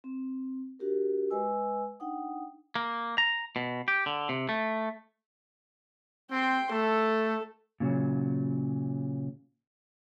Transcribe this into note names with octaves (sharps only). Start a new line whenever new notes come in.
C4
D4 F#4 G4 A#4
G#3 B4 D#5 G#5 E6
D4 D#4 F#5 G5 D#6
A#3
A#5
B2
G4
D3
C3
A3
C4 G5 C6
A3 A4
A#2 C#3 F#3